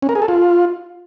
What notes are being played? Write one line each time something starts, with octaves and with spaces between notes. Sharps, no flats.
C#4
A#4
G#4
A4
F4